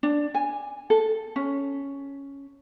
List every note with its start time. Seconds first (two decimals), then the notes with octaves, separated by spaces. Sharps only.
0.03 D4
0.34 G#5
0.90 A4
1.36 C#4